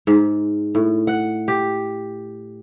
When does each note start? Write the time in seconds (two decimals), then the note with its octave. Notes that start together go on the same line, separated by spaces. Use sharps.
0.07 G#2
0.75 A2
1.07 F#5
1.48 G4